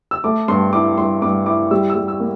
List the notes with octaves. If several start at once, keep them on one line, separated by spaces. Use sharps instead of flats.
E6
A3 D6
G2 C6
E4 D6
G2 C6
G2 D6
E4 D6
G3 E6
E6
G3
E6
A#3